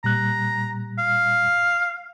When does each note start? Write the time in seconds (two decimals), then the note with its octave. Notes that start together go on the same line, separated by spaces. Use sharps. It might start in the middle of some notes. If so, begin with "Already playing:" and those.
0.04 A#2 G3 A#5 F#6
0.98 F5